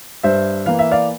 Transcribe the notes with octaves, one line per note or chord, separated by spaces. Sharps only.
G2 C5 E5
E3 A#3 F5
E5
D5 F5